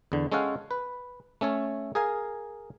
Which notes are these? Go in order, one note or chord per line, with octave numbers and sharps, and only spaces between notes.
E2 D3
G#3 C#4 A4 C#5 F5 F#5
B4
A3 C#4 A4 C#5
G#4 A#4 F5 G#5